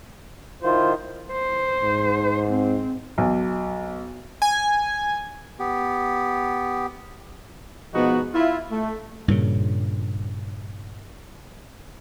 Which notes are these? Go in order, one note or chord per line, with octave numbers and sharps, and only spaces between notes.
D#3 E4 F4 C5
C5
G#2
C4
B1
G#5
B3 G4
B2 F3 G#3 B3 D#4 F#4
E4 F4
A3
G2 A#2 C#3